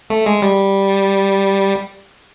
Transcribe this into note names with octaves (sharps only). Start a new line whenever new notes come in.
A3
G#3
G3